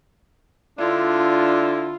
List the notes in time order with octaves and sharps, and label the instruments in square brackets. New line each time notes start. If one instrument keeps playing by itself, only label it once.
[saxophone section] D3 D4 E4 [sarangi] F4